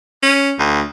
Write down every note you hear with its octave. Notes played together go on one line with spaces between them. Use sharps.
C#4
D2